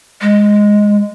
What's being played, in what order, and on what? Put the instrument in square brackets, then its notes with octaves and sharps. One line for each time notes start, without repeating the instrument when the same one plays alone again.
[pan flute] G#3